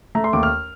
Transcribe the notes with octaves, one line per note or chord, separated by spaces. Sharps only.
A3 A#5
C6
D#2 D6
F6